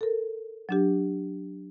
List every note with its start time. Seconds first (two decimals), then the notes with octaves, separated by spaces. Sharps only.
0.01 A4 A#4
0.69 F#3 D4 G4